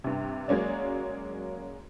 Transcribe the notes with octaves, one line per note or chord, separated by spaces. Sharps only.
G2 C3
F#3 G#3 A#3 C#4 D5